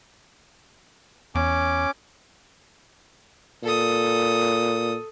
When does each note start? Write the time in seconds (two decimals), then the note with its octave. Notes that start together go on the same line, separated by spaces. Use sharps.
1.35 E2 C#4 D6
3.63 A#2 A4 D#6